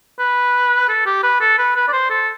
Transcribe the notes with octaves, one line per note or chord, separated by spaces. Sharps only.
B4
A4
G4
B4
A4
B4
B4
D5
C5
A4